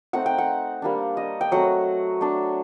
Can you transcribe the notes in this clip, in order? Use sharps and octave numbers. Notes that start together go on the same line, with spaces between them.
A3 C4 D#4 F#5
G5
F#5
G3 A#3 D4
D#5
G5
F#3 A3 C4 F#5
A3 D4